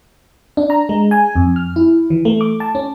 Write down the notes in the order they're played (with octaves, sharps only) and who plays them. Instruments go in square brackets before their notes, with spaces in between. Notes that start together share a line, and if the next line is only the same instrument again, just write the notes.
[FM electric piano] D4
A#5
G#3
G#5
F2
F6
E4
E3
A3
D6
A5
C#4